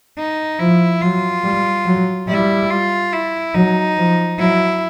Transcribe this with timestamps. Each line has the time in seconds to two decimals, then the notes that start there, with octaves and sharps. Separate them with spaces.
0.18 D#4
0.59 F3 E4
1.02 F#3 F4
1.44 G3
1.86 F#3
2.28 G3 E4
2.70 F4
3.13 E4
3.54 F#3 D#4
3.97 F3
4.38 F#3 E4